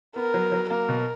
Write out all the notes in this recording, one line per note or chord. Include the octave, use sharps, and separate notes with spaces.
B3 A#4
F#3
F#3
A#3 A#4
B2